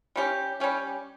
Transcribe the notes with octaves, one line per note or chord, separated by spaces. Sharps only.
G3 C#4 G4
G3 C#4 G4